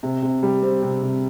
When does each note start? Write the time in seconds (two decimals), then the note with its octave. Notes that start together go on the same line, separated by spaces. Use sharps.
0.03 C3
0.22 C3
0.43 G3
0.63 C4
0.82 C3
1.03 C3